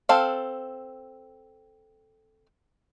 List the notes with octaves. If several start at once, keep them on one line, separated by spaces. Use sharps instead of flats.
C4 A4 F5